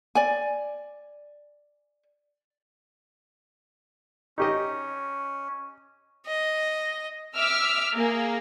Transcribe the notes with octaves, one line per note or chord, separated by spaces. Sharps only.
D5 G#5
C#4 D#4 G4 D#5
D#5
E5 D6 E6 F6
A#3 G#4